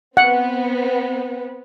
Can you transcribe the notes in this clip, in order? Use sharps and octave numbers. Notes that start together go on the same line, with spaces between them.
B3 C4 F#5